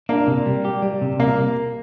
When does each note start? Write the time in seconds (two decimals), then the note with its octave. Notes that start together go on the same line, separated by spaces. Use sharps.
0.09 A#3 D4
0.27 C3
0.46 G3
0.65 G4
0.82 G3
1.02 C3
1.20 C3 A#3